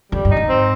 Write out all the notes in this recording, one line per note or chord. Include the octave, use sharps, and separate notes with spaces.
F2 G3
G2
D#4
G#2
C4